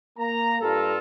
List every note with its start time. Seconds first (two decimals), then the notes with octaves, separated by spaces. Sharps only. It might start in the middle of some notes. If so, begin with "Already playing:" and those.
0.19 A#3 A#5
0.61 G2 G3 F4 A4